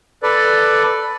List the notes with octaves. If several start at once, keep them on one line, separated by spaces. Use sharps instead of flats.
A4 B4 D5